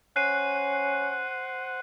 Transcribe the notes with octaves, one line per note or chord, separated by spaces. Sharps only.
C#4 C5 F#5 F#6 C7 D#7